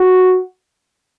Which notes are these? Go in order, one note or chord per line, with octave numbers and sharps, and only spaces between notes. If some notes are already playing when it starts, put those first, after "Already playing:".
Already playing: F#4